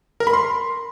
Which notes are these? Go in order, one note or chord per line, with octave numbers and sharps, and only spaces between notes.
A#4
B5
C6